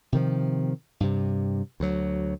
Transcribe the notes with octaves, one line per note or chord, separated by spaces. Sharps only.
C3 D#3 F3
G2 C3
D2 F#3